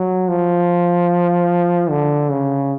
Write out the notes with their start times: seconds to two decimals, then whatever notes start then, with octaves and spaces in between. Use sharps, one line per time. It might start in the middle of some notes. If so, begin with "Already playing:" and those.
Already playing: F#3
0.28 F3
1.90 D3
2.31 C#3